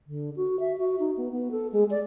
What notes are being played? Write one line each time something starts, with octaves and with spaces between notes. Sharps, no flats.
D3
F#4
E5
F#4
D#4
B3
B3
A4
G#3
D5